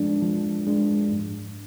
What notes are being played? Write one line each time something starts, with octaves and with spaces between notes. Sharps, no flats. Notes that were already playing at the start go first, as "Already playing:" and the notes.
Already playing: F3 G#3 D4
F3
G#3 D4
G#2